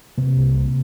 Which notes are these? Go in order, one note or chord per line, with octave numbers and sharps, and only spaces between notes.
C3 A#3
C2
C3